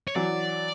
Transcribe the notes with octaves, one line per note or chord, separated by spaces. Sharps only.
C#5
E3 F#3 D5